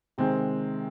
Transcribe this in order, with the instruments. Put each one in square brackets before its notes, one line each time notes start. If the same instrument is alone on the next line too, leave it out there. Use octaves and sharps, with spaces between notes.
[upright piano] C3 D#3 G#3 C4